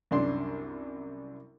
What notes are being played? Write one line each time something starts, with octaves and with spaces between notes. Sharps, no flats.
C2 F#2 D4 C6